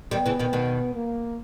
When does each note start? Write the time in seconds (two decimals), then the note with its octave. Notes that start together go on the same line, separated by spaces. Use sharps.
0.11 D#3 G3 B3
0.26 C#3 E3
0.39 B2 D#3
0.53 B2 D#3
0.94 A#3